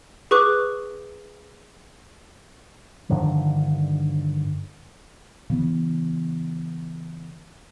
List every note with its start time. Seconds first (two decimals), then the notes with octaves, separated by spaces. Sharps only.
0.31 G#4 B4 C#6 D6 F#6
3.10 G2 D3 D#3 F3
5.50 C#3 E3 B3